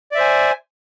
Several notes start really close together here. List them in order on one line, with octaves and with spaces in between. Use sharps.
D5 E5 C5 G#5